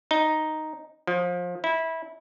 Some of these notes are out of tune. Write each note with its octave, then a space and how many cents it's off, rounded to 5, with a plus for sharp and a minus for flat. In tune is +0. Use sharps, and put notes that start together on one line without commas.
D#4 +0
F3 +25
E4 -20